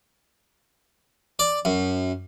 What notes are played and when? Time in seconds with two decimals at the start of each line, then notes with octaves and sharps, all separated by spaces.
1.39 D5
1.65 F#2